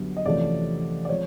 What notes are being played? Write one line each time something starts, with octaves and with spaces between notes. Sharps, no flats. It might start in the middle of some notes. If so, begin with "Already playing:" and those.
Already playing: F#2 D3 G3 B3
D#5
E2 C3 F3 A3 C#4 D5
D5
F3 G#3 C4 C#5